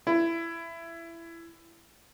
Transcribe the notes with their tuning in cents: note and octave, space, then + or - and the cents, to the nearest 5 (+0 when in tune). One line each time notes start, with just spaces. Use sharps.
E4 +20